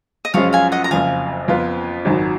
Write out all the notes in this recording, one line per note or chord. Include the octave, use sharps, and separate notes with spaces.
D#5
F#2 F3 G#3 C#4 F4 C#5 F5
F5 G#5
D#5 F#5
A#5
F#1 F2 F3 F5 G#5
F2 F3 B3 F4
G#1 F#2 D#3 F#3